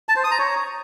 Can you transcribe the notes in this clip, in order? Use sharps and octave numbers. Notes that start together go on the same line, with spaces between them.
A5
C5
D#6
A#5
C#5